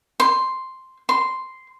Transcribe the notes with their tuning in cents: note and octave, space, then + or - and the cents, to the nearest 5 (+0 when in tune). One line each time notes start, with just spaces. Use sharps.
C6 +0
C6 -5